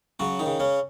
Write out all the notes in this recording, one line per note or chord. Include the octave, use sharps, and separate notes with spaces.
C#3 F#3 F#4
D#3 D#4
C#3
C#3 C#4